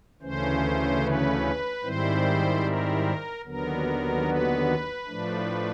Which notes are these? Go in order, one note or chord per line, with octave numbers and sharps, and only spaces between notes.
D2 C#3 E3 A3 C#4 C5
B4
G#2 D#3 G3 C4 E4 C5
A#4
D#2 D3 F#3 B3 A#4
B4
A2 F3 A3 D4